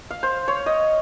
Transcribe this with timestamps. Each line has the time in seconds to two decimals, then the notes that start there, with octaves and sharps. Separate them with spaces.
0.11 F5
0.23 C5
0.48 C#5
0.66 D#5